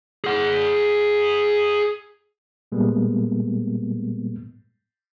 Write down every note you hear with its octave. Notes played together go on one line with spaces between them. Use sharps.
G#4 F#5
A#2 G3 G#3 A#3 B3